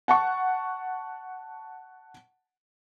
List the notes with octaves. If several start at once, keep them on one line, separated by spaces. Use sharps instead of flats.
F#5 A5 C#6